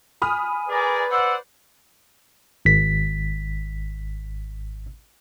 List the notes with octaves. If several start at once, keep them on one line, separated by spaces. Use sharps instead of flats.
G#5 B5 D#6 F6
G#4 A#4 B4 D5
C5 D5 F#5 E6
G#1 B6